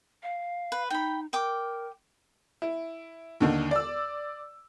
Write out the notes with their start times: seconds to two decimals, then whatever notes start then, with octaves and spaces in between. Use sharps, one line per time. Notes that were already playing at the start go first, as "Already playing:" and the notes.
0.23 F5
0.72 B4
0.90 D#4 G5 B5
1.33 A#4 G5 D6
2.62 E4
3.40 D#2 D3 D#3
3.71 D5 E6